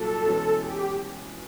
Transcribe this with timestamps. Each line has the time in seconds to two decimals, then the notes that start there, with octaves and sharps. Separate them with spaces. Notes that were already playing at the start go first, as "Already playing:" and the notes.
Already playing: C2 A#2 F#3 A4
0.26 E2 B2 G#3 C#4
0.60 G4